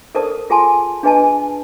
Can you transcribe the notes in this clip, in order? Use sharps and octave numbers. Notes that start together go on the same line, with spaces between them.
A4 A#4 C5 D5 A5 D#6
F4 G#4 A4 G#5 A5 C6
D4 G#4 B4 D#5 G#5 A5